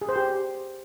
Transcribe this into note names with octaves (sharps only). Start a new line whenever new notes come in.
G#4
C5
G4